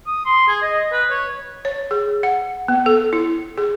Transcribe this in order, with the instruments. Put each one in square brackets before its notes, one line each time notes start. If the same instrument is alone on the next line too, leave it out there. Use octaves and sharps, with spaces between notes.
[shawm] D#6
C6
G#4
D#5
B4
C#5
[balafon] C#5
G#4
F#5
B3
A4
E4
G#4